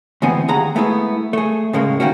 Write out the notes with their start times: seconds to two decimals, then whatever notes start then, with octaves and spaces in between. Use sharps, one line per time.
0.22 D2 G#2 E3 B3 C4 G#5
0.48 D#2 G#4 F#5 A#5
0.75 G#3 A3 B3 E4 G#4
1.33 A3 G#4
1.73 A2 C#3 G#3 A#3
2.00 D#3 G3 A#3 C#4 F#4